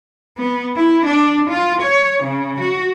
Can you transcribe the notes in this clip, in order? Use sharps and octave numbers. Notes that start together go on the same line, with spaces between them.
B3
E4
D4
F4
C#5
C#3
F#4